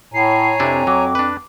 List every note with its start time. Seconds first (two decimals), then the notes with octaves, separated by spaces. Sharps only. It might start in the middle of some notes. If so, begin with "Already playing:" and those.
0.14 A2 C#5 G#5 A#5 C7
0.60 F2 C3 D4 E4
0.87 F#3 D6
1.15 D4 B4